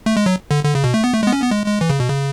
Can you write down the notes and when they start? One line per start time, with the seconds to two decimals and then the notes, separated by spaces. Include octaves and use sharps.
0.06 A3
0.17 G#3
0.26 F#3
0.51 D3
0.64 D3
0.75 C#3
0.84 B2
0.94 A3
1.04 B3
1.13 A3
1.23 G#3
1.27 B3
1.33 C#4
1.42 B3
1.51 G#3
1.66 G#3
1.81 E3
1.90 C#3
2.00 B2
2.10 C#3